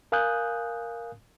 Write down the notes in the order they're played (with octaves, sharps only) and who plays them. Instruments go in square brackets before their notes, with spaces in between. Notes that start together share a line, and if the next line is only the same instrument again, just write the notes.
[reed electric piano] A#4 F5 G#5 D#6 F#6 G6